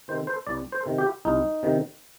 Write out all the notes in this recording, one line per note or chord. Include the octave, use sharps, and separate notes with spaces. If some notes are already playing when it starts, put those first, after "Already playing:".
C3 D#3 C5
C5
C2 D5
C5
C3 D#3
G4
C2 D#4
C3 D#3